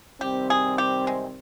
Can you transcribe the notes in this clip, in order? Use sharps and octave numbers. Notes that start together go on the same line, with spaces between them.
C3 D#3 G3 C4 G4
G#4
G4
G#3